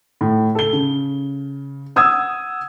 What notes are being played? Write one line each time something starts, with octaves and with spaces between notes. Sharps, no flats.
A2
A4 G7
C#3
F#5 D#6 E6 G#6